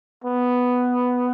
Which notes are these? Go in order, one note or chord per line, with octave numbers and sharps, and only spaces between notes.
B3